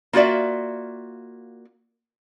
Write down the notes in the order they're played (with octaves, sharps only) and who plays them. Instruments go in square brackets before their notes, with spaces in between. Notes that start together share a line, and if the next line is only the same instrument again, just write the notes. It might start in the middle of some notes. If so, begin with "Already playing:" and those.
[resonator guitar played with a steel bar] A#3 F4 F#4 D5 E5